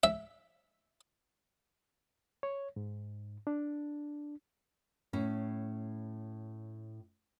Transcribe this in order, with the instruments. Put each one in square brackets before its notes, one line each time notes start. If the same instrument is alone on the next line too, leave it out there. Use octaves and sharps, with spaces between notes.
[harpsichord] E5
[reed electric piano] C#5
G#2
D4
[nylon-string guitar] A2 C#4